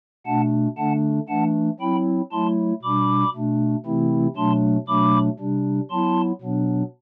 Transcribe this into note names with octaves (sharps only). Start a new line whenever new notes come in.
B2 A3 D4 F#5 A5
D3 A3 D4 F#5 A5
E3 A3 D4 F#5 A5
F#3 C4 E4 G5 B5
F#3 A3 E4 A5 C6
B2 G3 D4 B5 D6
B2 A3 D4
C3 E3 A3 C4 E4
B2 F#3 A3 D4 A5 C6
B2 F#3 A3 D4 B5 D6
C3 G3 D4
F#3 B3 E4 A5 C6
B2 F#3 B3 D4